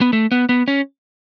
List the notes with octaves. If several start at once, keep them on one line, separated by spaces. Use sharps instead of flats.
B3
A3
B3
B3
C#4